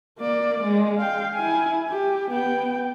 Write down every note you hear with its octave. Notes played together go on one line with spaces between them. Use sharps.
A#3 D5
G#3
F5 G5
E4 G#5
G4
B3 G5